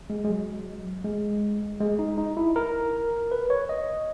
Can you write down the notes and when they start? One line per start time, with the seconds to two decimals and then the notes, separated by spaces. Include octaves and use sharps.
0.10 G#3
0.25 G#3
0.29 F#3
1.05 G#3
1.80 G#3
1.99 D#4
2.18 D#4
2.37 E4
2.56 A#4
3.32 B4
3.50 C#5
3.69 D#5